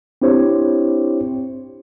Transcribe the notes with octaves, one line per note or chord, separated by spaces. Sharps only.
C4 D4 E4 G4 C5 C#5